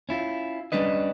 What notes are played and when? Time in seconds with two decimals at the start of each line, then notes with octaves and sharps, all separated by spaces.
0.09 C#4 E4 F4
0.72 G3 C#4 D4 B4 D#5